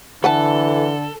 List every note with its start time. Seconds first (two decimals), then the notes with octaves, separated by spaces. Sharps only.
0.24 D3 E3 A4 B4 F#5 A5